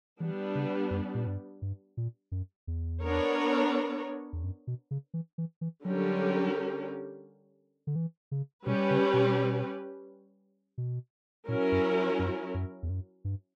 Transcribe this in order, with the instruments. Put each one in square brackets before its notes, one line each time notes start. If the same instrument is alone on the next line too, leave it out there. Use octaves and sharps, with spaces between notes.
[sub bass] E3 [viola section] G3 B3 D4
[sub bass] C#3
F#2
A#2
G2
G2
A#2
F#2
E2
[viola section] B3 D4 A#4 C#5
[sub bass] E2
F#2
B2
C#3
E3
E3
E3
[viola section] D3 G3 C#4 G4 A#4 [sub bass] F#3
[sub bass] D3
E3
C#3
[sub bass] B2 [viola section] G3 C#4 G4 B4
[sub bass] C#3
B2
B2
[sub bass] A#2 [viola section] F#3 C#4 E4 A#4
[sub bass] F#2
F#2
F#2
E2
F#2
G2